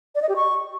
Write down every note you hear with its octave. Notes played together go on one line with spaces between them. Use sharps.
D5
D#5
G4
C#6